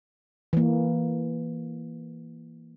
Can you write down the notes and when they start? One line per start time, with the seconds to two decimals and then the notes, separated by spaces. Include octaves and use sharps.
0.53 E3 A#3